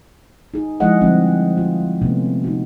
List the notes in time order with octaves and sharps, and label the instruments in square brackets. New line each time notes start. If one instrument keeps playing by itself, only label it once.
[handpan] D#4 G#4
F3 G#3 E4 G#4 D#5 F#5
D3 F3 G3 C4 F4
F4
C3 A3 B3 C#4
D#4 F#4